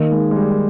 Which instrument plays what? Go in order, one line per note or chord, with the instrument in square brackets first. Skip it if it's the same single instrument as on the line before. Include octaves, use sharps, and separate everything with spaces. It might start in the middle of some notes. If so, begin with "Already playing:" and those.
Already playing: [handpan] D#3 A#3 D#4
[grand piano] G#3
G#3
G3